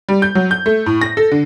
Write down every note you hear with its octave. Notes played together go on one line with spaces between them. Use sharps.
G3
G6
F#3
G6
A3
A2
A#6
A4
D3